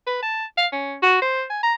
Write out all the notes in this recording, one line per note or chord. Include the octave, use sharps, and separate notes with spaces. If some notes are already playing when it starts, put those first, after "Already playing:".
B4
A5
F5
C#4
F#4
C5
G#5
A#5